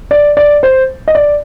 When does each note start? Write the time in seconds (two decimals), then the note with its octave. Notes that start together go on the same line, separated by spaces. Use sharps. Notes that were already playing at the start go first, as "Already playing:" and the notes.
0.11 D5
0.37 D5
0.63 C5
1.08 D#5
1.15 D5